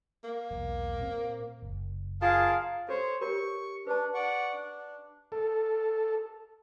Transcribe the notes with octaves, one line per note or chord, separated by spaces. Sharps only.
A#3
E1 B1
A#2 C4
F#1
F4 G#4 A#4 F5 A5
A4 C5 C#5
G4 A#4 C#5 C#6
D4 B4 A5
D5 F#5 C#6
D4
A4